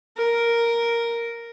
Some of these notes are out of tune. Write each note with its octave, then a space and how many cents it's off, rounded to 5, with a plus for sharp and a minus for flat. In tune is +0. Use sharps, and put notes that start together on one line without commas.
A#4 +0